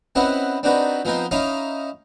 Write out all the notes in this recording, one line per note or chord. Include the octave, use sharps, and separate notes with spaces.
C4 C#4 E4 B4 D#5 F#5
C4 D4 D#4 F#4 B4
F3 B3 C4 D#4 F4
C#4 D#4 E4 C#5 D#5 F5